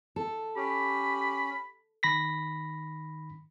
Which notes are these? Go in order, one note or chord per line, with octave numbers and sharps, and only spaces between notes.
A4
C#4 G4 B5
D#3 B5 A#6 B6